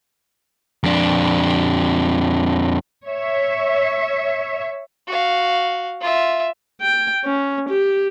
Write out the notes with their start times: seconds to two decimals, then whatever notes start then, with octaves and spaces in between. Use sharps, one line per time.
0.84 F2 D4
3.06 C#5 E5
5.08 F#4 F5
6.01 F4 E5
6.82 G5
7.25 C#4
7.69 G4